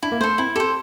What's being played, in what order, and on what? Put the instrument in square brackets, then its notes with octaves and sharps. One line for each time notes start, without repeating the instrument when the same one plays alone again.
[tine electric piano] D4 [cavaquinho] E4
[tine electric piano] A#3
[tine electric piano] A3 [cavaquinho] C5
[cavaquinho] A4
[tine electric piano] C4 [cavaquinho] E4
[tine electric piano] G4 [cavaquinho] A4
[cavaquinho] C5